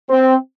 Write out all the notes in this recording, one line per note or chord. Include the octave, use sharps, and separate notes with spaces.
C4